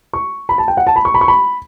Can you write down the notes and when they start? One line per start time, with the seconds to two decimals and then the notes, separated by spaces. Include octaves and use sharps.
0.13 C#6
0.49 B5
0.58 A5
0.68 G5
0.77 F#5
0.87 A5
0.96 B5
1.05 C#6
1.14 B5
1.21 C#6
1.28 B5